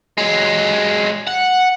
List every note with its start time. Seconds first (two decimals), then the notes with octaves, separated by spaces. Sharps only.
0.18 F#3 G#3
1.28 F#5